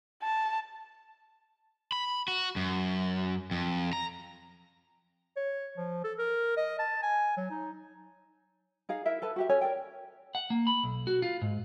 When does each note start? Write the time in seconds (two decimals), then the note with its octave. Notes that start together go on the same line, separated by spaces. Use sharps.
0.23 A5
1.92 B5
2.28 F#4
2.56 F#2
3.51 F2
3.93 A#5
5.36 C#5
5.77 F3
6.04 A4
6.18 A#4
6.57 D#5
6.79 A5
7.03 G#5
7.37 F#3
7.51 D#4
8.89 D#4 G#4 F5
9.06 E4 A#4 E5
9.22 A4 B4 A5
9.36 F#4 G4 E5
9.49 C#4 A4 C#5 G#5
9.61 A#4 D5 G5
10.35 F#5
10.50 A#3
10.67 B5
10.84 B1
11.07 F#4
11.22 F4
11.42 G#2